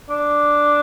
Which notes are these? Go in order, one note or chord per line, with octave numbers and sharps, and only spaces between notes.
D4